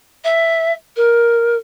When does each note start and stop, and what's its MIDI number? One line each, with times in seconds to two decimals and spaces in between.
0.24 0.72 76
0.96 1.56 70